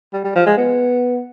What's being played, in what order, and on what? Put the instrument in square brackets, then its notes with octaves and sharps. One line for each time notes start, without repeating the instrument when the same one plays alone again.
[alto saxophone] G3
G3
F3
G#3
B3